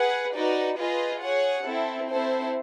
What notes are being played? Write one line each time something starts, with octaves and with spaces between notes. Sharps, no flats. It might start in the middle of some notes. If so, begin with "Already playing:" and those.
Already playing: G#4 B4 F#5
D#4 F#4 B4 D5
F4 G#4 B4 D#5
G#4 C#5 F#5
C4 E4 A4
C4 E4 A4 C5